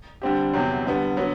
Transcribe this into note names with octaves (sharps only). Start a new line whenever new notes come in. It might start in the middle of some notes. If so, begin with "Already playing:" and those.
D3 G3 C4 G4
E2 C3 F#3 C4
D3 G3 B3
D3 F#3 B3